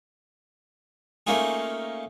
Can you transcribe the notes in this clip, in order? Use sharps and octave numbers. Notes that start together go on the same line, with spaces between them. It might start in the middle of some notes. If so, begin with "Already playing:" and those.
A3 A#3 C#4 D#4 F4 G#4